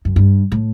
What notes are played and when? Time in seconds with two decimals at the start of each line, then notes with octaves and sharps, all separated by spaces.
0.05 F#2
0.16 G2
0.52 A2